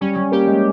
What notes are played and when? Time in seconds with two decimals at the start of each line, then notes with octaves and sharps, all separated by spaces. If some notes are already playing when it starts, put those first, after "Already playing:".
0.01 G3 C#4
0.16 G3
0.32 A#3 G4
0.47 G#3